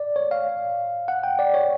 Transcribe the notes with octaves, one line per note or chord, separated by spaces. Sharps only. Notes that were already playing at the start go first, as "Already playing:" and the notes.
Already playing: D5
C#5
F5
F#5
G5
D5
C#5